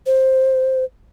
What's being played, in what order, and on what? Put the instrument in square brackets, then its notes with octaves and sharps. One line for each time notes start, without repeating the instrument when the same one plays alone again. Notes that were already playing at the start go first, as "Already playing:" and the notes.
[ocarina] C5